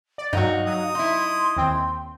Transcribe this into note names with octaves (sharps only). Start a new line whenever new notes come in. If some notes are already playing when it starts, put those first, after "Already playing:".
D5
G2 F#3 D#4 F#4 F5
F#3 D#6
D#4 E4 C6
D#2 C4 G5